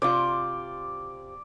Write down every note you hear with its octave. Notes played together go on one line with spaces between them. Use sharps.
C3 F4 D5